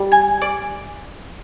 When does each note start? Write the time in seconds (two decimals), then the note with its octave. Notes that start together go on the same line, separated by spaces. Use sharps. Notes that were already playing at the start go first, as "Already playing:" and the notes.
Already playing: G3
0.12 G#5
0.42 D5